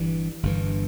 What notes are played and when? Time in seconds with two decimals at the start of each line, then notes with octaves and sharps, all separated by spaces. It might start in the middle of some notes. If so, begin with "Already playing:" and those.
Already playing: G1 G2 E3
0.43 G1 G2 E3